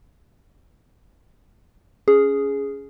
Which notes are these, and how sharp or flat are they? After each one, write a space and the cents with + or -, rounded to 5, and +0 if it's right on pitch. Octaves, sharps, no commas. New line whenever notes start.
C#4 +15 G#4 +0